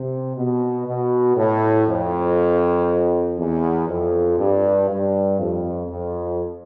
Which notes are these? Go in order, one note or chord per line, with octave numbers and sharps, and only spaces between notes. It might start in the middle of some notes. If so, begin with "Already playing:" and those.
Already playing: C3
B2
B2
A2
F2
E2
F2
G2
G2
F2
F2